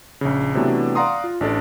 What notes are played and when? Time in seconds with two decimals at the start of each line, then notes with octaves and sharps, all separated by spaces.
0.21 A#1 C#3
0.55 C3 E3 F#3 A3 B3 D4
0.95 D5 F5 F#5 A#5 C6 D#6
1.24 F4
1.41 A1 D4 A4 D5